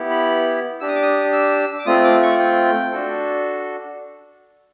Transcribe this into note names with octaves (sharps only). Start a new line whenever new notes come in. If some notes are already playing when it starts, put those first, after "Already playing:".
Already playing: B3 E4 G4
B5
D4 G4 E6
D#6
D6
D#6
E6
D6
A3 C4 F4 D#6
D6
C#6
G5
D4 F#4 A4